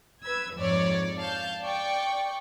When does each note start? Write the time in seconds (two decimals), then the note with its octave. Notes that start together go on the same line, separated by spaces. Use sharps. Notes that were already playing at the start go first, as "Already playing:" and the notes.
0.23 B4 E6 G#6
0.55 F2 G#2 C#5 D5
1.18 F5 A5 G6
1.62 D5 G5 C#6